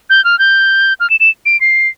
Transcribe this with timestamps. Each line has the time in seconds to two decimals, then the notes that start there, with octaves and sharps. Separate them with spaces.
0.10 G6
0.24 F6
0.39 G6
1.00 F6
1.10 E7
1.20 E7
1.46 D7
1.60 C7